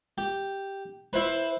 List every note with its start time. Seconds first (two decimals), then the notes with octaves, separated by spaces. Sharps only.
0.18 G4
1.13 E4 B4 C5